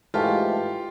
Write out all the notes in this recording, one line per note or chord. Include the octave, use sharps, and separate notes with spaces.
G#2 E3 A3 F4 G4